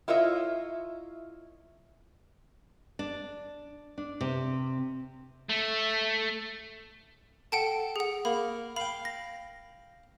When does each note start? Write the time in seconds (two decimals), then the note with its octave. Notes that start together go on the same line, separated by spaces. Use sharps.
0.08 E4 F4 A#4 C#5 D#5 E5
2.99 D4
3.98 D4
4.21 C3
5.49 A3
7.52 A4 F#5 G5 A5
7.96 G#4 F#5
8.25 A#3 B5
8.76 F5 G5 B5
9.05 A#6